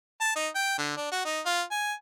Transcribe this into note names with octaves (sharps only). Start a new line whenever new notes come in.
A5
D#4
G5
D3
D4
F#4
D#4
F4
G#5